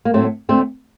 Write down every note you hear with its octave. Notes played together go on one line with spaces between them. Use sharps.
A#3
A2 F#3 A3 C4
D2 D3 A3 C4